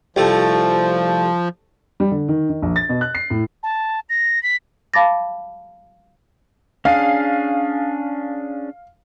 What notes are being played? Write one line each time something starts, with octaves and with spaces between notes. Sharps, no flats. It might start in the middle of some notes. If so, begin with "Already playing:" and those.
C2 F3 A3 G4
G3
D3
D#3
D#3
A#1
A6
B2
F#6
C7
A2
A5
A#6
B6
F5 A5 B5 D6 A6 A#6
C#4 D4 G#4 F5